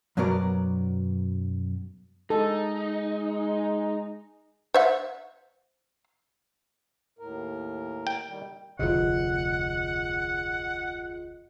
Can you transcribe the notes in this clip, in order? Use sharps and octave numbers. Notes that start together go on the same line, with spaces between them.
F#2 B2 F#3 B3 A#4 D5
G#3 D#4 A4
C5 E5 F#5
D#2 A2 A#4
G5
D#3 G3
F1 D2 C3 F4 G#4 D#5 F#5